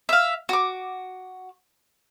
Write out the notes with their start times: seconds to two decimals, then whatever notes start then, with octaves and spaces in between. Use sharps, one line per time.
0.09 E5 F5
0.49 F#4 D6